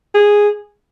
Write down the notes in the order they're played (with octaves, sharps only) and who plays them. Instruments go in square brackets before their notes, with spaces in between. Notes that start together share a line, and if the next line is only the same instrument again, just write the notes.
[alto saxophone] G#4